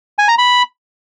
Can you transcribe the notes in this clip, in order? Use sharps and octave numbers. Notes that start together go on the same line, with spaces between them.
G#5
A#5
B5